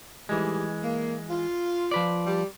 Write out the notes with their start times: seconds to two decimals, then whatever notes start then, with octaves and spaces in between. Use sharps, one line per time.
0.29 A2 D#3 E3 G3 G#3
0.83 A#3
1.30 F4
1.91 F3 B4 D5
2.26 G3